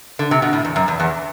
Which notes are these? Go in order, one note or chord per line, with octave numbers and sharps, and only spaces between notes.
D3
C3
B2
A2
E2
F#2
E2
E2